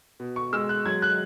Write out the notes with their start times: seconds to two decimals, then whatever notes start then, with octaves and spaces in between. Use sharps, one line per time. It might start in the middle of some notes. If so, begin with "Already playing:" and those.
0.20 B2
0.36 C#6
0.53 G#3 E6
0.69 F#6
0.86 F#3 G#6
1.02 F#6